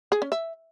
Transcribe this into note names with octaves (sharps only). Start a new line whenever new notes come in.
G#4
C#4
E5